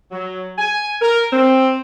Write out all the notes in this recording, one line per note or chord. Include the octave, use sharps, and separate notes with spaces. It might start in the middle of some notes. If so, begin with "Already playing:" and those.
F#3
G#5
A#4
C4